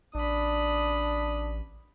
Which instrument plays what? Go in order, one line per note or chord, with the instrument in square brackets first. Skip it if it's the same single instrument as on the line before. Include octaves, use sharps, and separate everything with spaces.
[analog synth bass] A1 [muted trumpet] D4 [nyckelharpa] B5 D#6